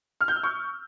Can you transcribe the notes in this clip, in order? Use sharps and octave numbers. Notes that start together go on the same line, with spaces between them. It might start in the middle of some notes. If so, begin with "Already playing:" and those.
F6
G6
E6
C#6